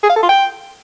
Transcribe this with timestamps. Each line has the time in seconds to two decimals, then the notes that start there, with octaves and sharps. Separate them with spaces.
0.03 G#4
0.10 F5
0.16 A4
0.23 F4
0.29 G5